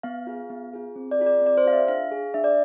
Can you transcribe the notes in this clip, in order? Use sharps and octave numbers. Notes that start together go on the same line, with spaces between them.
B3 F5
F4 G#4
B3
F4 G#4
C4
D5
F4 G#4
D5
C4 D5
C5
F4 G#4 F5
E5
D4 F5
G#4
D4 E5
D5